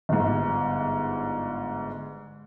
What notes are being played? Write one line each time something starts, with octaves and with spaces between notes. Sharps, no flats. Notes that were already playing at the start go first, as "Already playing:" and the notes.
G1 G#2